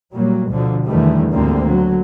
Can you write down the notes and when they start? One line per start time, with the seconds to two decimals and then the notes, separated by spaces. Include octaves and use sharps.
0.13 A#2 F#3 G3 A#3
0.48 D2 B2 D3 F3 F#3
0.84 E2 D3 D#3 G3 A3
1.31 D2 G#2 D3 G3 A#3 C4
1.64 D3 F#3